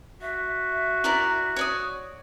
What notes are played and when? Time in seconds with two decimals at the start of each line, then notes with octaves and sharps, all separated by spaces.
0.21 F#4 E5
1.04 E4 A#4 D5
1.56 C#5 D5 D#6